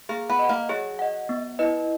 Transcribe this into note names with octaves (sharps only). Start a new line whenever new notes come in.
A#3 G#4
B3
D#5 F#5
A#3
F#3 G#4
D#5 F#5
B3
E4 B4 D#5